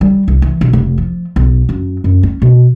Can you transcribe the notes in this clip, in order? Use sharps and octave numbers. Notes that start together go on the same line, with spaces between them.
G3
C2
E3
B1
F1
F3
B1
F#2
F#2
C#4
B2